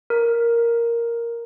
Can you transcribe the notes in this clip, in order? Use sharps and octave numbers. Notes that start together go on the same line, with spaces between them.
A#4